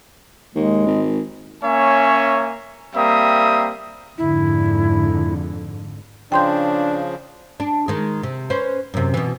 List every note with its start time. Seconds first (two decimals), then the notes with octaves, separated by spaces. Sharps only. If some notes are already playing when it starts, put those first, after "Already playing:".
0.55 D#2 G#3
0.87 G#1
1.63 A#3 C#4 C#5 E5 G#5
2.94 G3 A#3 C4 E5 D#6
4.18 F2 G#2 D3 E4
6.32 C#3 F3 D4 G5 C6 G6
7.60 D4
7.88 D#3 G#3
8.23 C3
8.50 C#4 B4 C5
8.94 F#2 C3
9.14 B2 E3